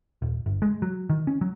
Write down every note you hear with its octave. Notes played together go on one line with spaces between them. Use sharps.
D#1
G1
G#3
F#3
D#3
C#4
F#3